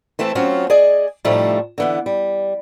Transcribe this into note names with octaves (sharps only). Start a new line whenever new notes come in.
E3 A3 C4 A4
F#3 C4 C#4 F4
G#4 D5 D#5 G#5
A2 C3 F3 G3 A3 D#4
D3 E3 B3
G3